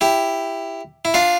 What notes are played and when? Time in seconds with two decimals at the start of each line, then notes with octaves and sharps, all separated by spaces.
0.01 E4 G4
1.05 E4
1.14 D4 F4